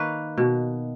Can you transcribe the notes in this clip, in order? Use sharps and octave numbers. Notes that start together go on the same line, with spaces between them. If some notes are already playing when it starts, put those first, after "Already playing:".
Already playing: D#3 A#3 B4 C#5
B2